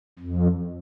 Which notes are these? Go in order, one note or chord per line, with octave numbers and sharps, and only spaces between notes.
F2